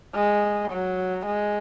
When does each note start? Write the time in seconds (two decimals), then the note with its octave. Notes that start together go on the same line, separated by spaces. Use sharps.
0.15 G#3
0.71 F#3
1.26 G#3